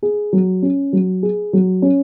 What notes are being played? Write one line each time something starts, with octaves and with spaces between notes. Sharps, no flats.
G#4
F#3
C#4
F#3
G#4
F#3
C#4